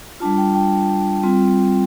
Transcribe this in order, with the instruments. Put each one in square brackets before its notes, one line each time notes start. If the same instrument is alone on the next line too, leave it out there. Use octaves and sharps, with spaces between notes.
[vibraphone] G3 D4 F4 A5
G5
G5
G3 C4 F4